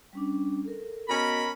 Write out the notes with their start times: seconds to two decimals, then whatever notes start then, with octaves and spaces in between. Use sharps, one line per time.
0.13 G3 C#4 D4
0.65 A4 A#4
1.09 B3 C#4 F#4 A#4 D#5 B5